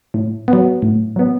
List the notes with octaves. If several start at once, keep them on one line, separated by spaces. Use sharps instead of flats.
A2
B3
F#3
A2
F#3 B3